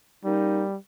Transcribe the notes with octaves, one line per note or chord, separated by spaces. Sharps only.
G3 A#3 C#4 D#4